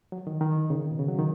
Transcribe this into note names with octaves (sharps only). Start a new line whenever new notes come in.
F#3
D#3
D#3
C#3
D#3
B2
C#3
F#3
D#3